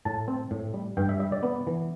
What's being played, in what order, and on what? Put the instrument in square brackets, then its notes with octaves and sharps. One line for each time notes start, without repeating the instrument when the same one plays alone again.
[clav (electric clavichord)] A2 A5
C4
A2
G3
G2 G5
E5
G3 E5
D5
B3
E3